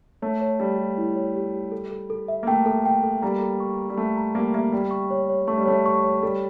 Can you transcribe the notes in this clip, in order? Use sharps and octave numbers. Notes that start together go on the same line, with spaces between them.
A3 C#5
C#5
G3 G4
G4
E4
C#5
G4
G4
A4
A4
A4
E5
A#3
A3 G5
A4
G5
A4
G3 A#3 A#5
A4
C#6
C#6
G3
A3 C#6
A#5
G3 A#3 E5
G3 A#3 E5
G3 G5
C#6
C#5
C#5
A3 C#6
G3
A3 C#5
C#6
C#5
G3 A4